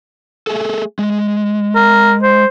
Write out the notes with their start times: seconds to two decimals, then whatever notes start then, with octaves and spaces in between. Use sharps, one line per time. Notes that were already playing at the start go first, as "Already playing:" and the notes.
0.47 A3 G#4 A4
0.99 G#3
1.75 A#4
2.23 C5